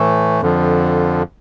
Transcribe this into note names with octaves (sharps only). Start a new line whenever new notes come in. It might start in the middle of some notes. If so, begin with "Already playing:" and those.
Already playing: A2 E3 A3
F2 D3 F3